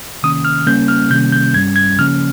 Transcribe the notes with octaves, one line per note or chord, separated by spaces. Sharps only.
C3 D#3 A#3 C#4 D#6
F6
C#3 G3 A#3 C#4 G6
F6
C3 D#3 G3 A#3 C#4 G6
G6
G2 G3 C#4 G#6
G#6
C#3 F3 A#3 C#4 F6